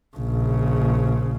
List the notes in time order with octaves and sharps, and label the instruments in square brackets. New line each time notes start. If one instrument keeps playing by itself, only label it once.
[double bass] A#1 C#3